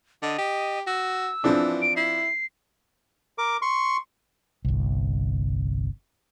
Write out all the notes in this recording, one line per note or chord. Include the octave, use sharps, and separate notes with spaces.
D3 D#5
G4
F#4 E6
E3 F3 C4 D4
D7
E4 C7
A#4 D6
C6 C#6
G1 C2